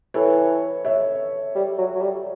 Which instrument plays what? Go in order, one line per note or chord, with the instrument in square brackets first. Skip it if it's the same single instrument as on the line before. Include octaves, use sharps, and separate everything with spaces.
[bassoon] E3 [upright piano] A4 C#5
[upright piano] C#5 E5
[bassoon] G3
F#3
F#3
G3